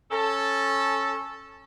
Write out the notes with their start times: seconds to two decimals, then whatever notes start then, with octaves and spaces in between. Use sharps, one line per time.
0.11 C#4 A4